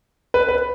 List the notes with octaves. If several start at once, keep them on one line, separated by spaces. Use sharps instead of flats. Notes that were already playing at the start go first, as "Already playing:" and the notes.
B4
B4